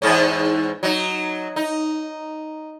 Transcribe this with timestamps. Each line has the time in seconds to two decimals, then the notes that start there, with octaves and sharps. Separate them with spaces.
0.02 E2 G#2 C#4
0.83 F#3 D#4
1.56 D#4